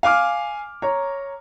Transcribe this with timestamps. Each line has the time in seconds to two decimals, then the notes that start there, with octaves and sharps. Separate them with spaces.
0.03 F5 G#5 D6 F6
0.82 C#5 A#5